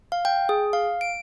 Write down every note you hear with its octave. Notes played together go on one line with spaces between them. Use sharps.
F5
G5
G#4
F5
D7